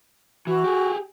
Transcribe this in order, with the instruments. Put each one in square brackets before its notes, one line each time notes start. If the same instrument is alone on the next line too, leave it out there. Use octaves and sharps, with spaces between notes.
[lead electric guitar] E3 [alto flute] F#4
[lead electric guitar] G4 G#4